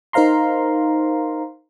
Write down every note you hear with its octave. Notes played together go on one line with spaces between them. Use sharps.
D#4 A#4 C5 F5 A#5 C6